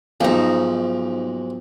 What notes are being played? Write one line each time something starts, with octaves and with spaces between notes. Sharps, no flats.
B1 G#2 F3 A#3 D#4 G#4 F5